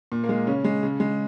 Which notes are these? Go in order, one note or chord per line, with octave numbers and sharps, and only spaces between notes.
A#2
A#3
G#3
C#3 C#4
G#3
C#3
G#3